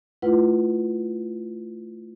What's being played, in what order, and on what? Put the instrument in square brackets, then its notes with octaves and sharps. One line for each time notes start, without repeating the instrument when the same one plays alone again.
[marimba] A3 E4 F4 B4 F#5